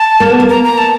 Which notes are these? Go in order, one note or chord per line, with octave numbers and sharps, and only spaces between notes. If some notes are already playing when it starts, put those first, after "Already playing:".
Already playing: A5
A#3
B3
A#3
A#5
A#5
A5